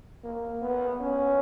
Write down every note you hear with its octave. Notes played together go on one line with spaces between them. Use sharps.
A#3
B3
C#4